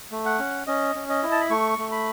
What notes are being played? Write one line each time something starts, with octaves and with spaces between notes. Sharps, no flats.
A3
F#5
C#4
C#4 D#5
C#4
D#5
E4
A5
B5
A3 C#6
A3
B5